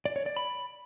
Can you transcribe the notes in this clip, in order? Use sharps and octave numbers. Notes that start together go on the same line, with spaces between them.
D5
C#5
D5
B5